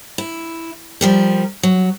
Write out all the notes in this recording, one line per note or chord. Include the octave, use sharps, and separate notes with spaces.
E4
F3 G3 A#4
F#3